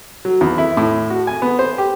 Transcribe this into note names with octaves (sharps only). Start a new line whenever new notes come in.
F#3
E2
E4
A2
F#4
G#5
B3
C5
G4